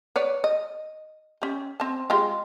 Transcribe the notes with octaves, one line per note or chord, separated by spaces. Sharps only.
B4 C#5 D5
D#5
C#4 G4
C4 A5
G#3 F4 G4